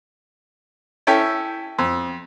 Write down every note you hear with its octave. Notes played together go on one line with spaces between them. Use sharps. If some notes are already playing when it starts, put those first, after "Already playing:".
C#4 E4 A4 G5
F2